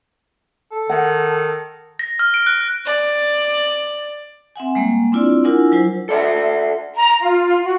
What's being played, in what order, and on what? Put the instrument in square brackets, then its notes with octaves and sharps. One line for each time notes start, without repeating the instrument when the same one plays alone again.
[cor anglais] A4
[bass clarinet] D#3 [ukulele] F#5
[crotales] A#6
F6
D7
F#6
[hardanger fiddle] D5
[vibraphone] C4 E5 F#5 G#5
G3 G#3 A#3
C4 D4 E4 F4 D5
D4 E4 F4 A#4 F#5 G#5
F#3 E4 C5
[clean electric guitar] A4 D5 E5 F#5
[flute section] A#5
F4
F#4